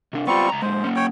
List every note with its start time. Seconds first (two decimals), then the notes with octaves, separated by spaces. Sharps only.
0.13 C3 D4
0.27 G3 B3 C4 F4 C#6
0.49 C#2 A#5
0.62 A#2 G#3 C5
0.84 A#3 C#4
0.96 C#5 G5